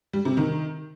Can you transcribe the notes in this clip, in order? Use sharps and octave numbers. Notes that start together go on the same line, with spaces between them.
G3
C3
D#3